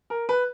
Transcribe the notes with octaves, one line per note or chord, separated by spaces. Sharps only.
A#4
B4